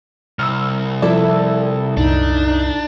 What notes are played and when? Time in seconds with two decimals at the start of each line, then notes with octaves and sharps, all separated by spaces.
0.39 C2 E6 F6
1.02 F3 E4 A4 D5 E5
1.97 C2 F#2 A#2 D4 D#4